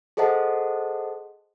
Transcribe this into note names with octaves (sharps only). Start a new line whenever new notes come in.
G#4 A4 C5 D#5 F#5 A5